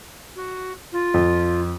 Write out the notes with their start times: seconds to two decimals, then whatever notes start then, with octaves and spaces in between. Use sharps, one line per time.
0.36 F#4
0.93 F4
1.14 F2